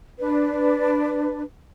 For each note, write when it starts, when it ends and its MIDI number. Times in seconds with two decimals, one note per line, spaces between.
0.19 1.41 62
0.19 1.41 71